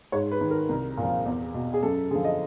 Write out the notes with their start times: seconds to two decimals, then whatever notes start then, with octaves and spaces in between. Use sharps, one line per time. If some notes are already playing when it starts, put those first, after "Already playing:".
0.12 G#2 C#5
0.31 B4
0.41 D#3
0.50 A#4
0.69 C2
0.97 A#2
1.02 F3
1.26 E2
1.54 B2
1.74 G#4
1.83 F#2 A4
2.11 D3 F3 G#4
2.25 D#5